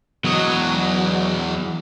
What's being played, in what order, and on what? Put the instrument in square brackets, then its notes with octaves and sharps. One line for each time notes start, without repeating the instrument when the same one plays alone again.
[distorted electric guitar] E2 D#5 [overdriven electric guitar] F#3